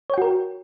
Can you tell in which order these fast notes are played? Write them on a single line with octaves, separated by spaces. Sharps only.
C#5 G5 F#4 A#4